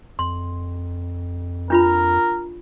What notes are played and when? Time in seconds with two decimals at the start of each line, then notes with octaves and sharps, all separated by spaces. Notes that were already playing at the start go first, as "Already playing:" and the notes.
0.19 F2 C6
1.70 D4 F4 A#4 B5